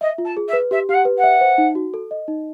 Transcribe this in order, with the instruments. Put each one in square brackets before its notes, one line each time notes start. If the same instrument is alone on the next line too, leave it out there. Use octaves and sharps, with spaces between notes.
[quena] D#5 [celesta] E5
[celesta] F4
[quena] A5
[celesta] G#4
[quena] E5
[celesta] B4
[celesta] G4 [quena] E5
[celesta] G4 [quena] F5 F#5
[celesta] B4
[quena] F#5
[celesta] E5
C5
D#4
F#4
A4
D#5
D#4